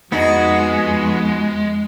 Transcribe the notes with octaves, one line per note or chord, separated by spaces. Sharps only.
F2 G#3 B3 D#4 F#4